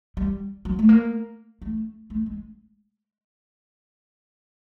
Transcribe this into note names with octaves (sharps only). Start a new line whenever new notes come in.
G3
F#3
A3
A#3
A3
A3
G#3